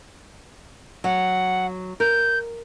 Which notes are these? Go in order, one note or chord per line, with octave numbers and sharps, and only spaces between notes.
F#3 F#5
A#4 G6